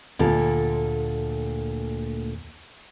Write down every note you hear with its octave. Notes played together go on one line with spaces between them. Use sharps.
D2 A#2 A4